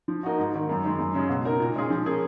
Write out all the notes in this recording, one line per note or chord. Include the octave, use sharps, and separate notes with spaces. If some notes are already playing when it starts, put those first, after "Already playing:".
F3
A#3 D#4 F#4
G#2
D#3 A#3
F#2
D#3 G#3
F#2
C#3 G#3 C#4 G#4
B2
A#3 D#4 A#4
A#2
G#3 C#4 F4 G#4
F3
A#3 C#4 G#4